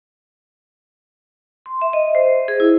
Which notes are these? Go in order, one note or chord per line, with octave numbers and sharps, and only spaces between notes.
C6
E5
D#5
C5
G#4
E4